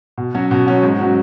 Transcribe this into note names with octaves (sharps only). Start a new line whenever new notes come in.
B2
F#3 C#4 F#4
B2
F#3 C#4 F#4
G#2
F#3 C#4 F#4